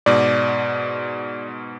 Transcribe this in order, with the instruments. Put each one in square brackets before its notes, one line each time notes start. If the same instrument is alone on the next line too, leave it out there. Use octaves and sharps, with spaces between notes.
[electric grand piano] G#2 B2 [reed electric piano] D5